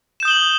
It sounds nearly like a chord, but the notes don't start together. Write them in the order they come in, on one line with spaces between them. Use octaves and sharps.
E7 G6 D#6 G7 F#7